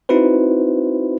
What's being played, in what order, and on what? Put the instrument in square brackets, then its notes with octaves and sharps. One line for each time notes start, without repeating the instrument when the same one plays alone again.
[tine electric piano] C4 D#4 E4 F#4 B4 C5